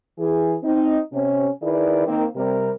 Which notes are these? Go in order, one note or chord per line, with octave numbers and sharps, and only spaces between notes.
E3 G#4
C4 D#4
C3 C#4
D#3 E4 G#4 B4 D5
D#3 A#3 C4
C3 G3 A#4